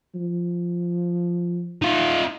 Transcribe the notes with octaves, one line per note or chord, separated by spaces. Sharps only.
F3
D#4 F4